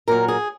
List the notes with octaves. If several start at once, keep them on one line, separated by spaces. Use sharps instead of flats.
A#2 F#3 A#4
G#4